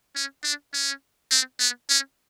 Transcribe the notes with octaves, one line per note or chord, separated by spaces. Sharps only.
C#4
D4
C#4
C4
B3
C#4